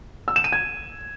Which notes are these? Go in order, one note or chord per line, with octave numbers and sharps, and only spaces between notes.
E6
E7
D#7
G#6